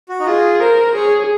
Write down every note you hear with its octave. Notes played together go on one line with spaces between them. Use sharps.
F#4
D#4
F4 G#4
A#4 C5
G#4 C#5